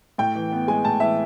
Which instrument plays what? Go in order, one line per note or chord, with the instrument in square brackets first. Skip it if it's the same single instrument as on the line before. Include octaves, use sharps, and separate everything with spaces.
[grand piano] A2 G5
E3
B3
G#3 G#5
A2 A5
E3 E5